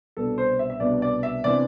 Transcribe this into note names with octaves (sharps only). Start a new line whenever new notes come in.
C2 B2 B3 D4 A4
C5
E5
E5
C2 B2 B3 D4 D5
D5
E5
C3 E3 B3 D4 D5